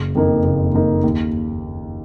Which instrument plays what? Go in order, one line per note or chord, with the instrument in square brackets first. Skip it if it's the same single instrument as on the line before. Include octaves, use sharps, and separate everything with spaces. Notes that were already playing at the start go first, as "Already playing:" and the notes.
Already playing: [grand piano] F#1
F2 D#3 A#3 D#4
F#1
F2 D#3 A#3 D#4
D#2